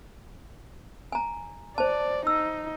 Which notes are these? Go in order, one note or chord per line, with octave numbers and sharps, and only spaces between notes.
G#5 A#5
C5 D5 A5
D#4 E6